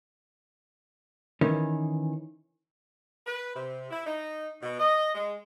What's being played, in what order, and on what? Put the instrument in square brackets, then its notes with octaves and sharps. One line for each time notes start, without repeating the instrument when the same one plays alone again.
[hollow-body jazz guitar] D#3 E3 C#4
[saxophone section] B4
C3
E4
D#4
B2
D#5
G#3